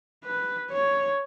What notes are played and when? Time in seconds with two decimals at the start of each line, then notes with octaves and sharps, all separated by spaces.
0.25 B4
0.71 C#5